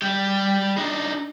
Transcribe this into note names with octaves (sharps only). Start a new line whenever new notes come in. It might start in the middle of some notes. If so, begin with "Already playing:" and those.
G3 G4
D4 D#4